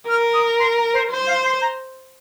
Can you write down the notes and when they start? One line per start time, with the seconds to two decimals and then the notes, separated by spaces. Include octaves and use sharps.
0.09 A#4 F6
0.34 D#6
0.60 C6
0.76 A#5
0.94 C5
1.11 C5
1.27 F5
1.44 C6
1.62 A#5